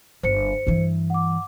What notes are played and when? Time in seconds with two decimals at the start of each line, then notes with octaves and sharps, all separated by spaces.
0.23 G1 C5 C#7
0.67 G2 E3
1.10 F#5 D6